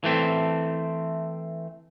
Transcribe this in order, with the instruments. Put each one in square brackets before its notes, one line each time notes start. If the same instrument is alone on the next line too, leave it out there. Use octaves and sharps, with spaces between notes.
[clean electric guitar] E3 A3 C4